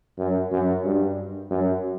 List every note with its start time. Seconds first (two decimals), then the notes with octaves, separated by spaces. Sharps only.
0.18 F#2
0.52 F#2
0.84 G2
1.51 F#2